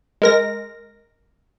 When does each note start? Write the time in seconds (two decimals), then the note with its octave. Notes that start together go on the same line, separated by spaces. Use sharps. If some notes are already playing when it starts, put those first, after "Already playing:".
0.22 G#3 A#4 A#6